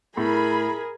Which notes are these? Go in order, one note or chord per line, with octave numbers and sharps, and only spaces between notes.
A2 G#4 A#4 B5